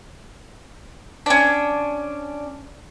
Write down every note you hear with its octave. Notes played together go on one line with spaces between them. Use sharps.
C#4 D4